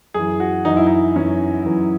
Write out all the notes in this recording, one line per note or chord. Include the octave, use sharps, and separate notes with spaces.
F#2 E3 G#4
F#4
F#2 E3 D#4
E4
D#4
F#2 E3 C#4
F#2 E3